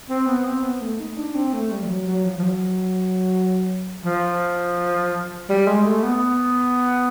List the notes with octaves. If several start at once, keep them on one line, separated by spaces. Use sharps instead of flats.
C4
B3
C4
B3
A3
D#4
D4
C4
A3
G3
F3
F#3
F#3
F3
F3
F#3
F3
G3
G#3
A3
B3